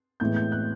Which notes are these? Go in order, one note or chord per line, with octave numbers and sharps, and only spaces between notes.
A2 E3 G#3 B3 G6
G6
F#6